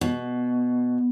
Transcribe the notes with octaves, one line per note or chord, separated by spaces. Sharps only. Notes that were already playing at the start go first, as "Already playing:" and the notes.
B2